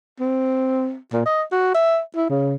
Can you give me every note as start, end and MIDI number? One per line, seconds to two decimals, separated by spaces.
0.20 0.96 60
1.13 1.21 46
1.26 1.42 75
1.52 1.74 66
1.74 1.99 76
2.16 2.29 64
2.30 2.55 49